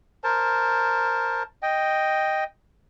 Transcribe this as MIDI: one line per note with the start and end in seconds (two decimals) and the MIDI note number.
0.24 1.43 70
0.24 1.43 72
0.24 1.43 81
1.63 2.44 75
1.63 2.44 79